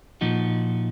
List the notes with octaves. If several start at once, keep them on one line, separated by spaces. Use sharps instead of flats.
A#2 F3 D#4 F#4